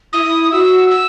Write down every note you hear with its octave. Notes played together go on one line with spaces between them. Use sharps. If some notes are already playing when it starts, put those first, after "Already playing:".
E4 D#6
F#4 E6
E6